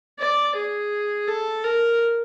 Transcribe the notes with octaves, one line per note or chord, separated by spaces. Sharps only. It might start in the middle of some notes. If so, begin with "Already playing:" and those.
D5
G#4
A4
A#4